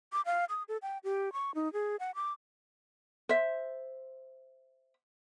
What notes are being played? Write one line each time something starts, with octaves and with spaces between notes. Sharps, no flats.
D6
F5
D#6
A4
G5
G4
C#6
D#4
G#4
F#5
D6
C5 E5